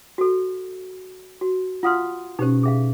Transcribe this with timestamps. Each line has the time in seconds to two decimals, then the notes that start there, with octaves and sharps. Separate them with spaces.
0.18 F#4 A4
1.41 F#4
1.83 F4 F5 F#5 C6 D#6 F6
2.39 B2 C#4 D#4 G4 C5
2.63 B2 G#4 E5 F5